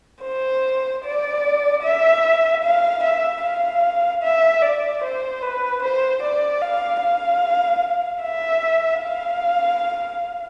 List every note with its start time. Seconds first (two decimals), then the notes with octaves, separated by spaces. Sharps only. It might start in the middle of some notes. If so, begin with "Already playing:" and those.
0.24 C5
1.04 D5
1.83 E5
2.63 F5
3.03 E5
3.43 F5
4.23 E5
4.62 D5
5.03 C5
5.42 B4
5.83 C5
6.22 D5
6.62 F5
7.02 F5
8.22 E5
9.01 F5